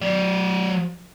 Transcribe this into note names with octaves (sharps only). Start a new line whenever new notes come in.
F#3 D5